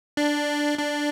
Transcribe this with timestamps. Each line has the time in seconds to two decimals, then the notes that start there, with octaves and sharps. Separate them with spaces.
0.17 D4
0.78 D4